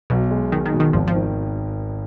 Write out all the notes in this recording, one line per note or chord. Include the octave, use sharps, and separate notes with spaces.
B1 B2
G#3
B1 D#3
D#3
B2
D#3
G#1 F3
F3
D#3